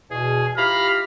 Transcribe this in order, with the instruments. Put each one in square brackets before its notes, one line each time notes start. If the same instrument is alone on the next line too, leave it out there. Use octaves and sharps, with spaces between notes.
[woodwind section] E2 B2 [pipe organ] G#4
[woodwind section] E4 F4 G4 [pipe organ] F5 A#5 B5 [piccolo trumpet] F6